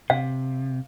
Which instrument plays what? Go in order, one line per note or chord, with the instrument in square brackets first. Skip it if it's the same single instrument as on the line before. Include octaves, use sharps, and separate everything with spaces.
[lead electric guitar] C3 [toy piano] F5